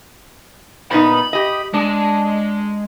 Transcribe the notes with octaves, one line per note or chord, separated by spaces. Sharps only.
A#2 B3 D#4 B5
G4 D#5
G#3 D4